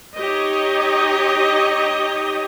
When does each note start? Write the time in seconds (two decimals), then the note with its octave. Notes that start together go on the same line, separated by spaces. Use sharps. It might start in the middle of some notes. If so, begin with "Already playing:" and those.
0.17 D#4 G4 C#5 D#5